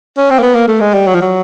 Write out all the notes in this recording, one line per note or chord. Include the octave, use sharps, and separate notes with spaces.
C#4
C4
A#3
B3
A#3
A3
G#3
G3
F#3
F3
F#3